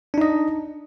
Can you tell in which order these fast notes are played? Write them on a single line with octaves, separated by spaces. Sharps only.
D4 D#4 D#5